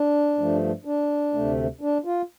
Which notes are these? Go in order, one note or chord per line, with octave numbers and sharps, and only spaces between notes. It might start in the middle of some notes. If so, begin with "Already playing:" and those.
Already playing: D4
G2 F3 A3
D4
D2 C3 A3
D4
F4